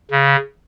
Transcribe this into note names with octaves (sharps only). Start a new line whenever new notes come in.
C#3